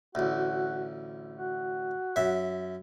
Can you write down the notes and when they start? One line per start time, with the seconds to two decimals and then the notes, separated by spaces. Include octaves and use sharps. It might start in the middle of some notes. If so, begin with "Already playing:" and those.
0.15 A1 D2 F#4
1.36 F#4
2.16 F#2 E5